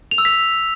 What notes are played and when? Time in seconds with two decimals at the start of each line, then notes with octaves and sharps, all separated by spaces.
0.11 F7
0.18 E6
0.25 B6